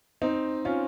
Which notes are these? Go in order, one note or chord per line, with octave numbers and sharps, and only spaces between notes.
C4 D#4
C#4 F4